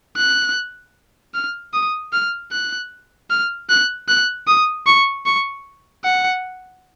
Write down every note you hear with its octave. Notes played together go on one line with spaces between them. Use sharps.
F#6
F6
D#6
F6
F#6
F6
F#6
F#6
D#6
C#6
C#6
F#5